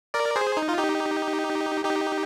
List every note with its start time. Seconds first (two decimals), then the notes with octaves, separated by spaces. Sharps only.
0.14 A#4 D5
0.36 G#4 C5
0.57 D#4
0.69 F4
0.78 D#4 G4
1.85 D#4 G4